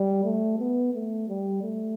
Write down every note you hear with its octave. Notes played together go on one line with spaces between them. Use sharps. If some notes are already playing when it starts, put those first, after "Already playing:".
Already playing: G3
A3
B3
A3
G3
A3